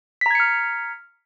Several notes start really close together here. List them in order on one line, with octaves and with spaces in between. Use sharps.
B6 A#5 G#6 C#7 F6